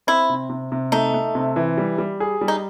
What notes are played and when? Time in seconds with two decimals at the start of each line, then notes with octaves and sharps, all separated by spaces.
0.07 C4 E4
0.29 C3
0.50 C3
0.72 C3
0.92 A3 D#4
1.14 A3
1.35 C3
1.56 E3
1.78 G3
1.98 G3
2.20 G#4
2.41 G3
2.48 D#4